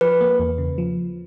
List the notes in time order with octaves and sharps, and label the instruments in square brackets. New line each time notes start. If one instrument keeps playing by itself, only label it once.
[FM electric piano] F3 [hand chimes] B4
[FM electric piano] A#3
E2
C#3
F3